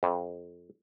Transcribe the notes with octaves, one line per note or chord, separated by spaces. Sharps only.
F2